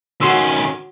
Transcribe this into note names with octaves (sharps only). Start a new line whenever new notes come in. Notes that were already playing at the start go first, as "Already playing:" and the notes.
D#3 C#4 F#4 C6 E6